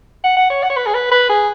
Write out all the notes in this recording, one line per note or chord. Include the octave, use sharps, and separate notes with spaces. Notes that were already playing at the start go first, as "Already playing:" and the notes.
F#5
F#5
C#5
F#5
C#5
B4
G#4
B4
B4
G#4